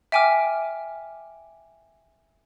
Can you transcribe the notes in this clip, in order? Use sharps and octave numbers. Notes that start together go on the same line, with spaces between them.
E5 G5 G#5 D6 F6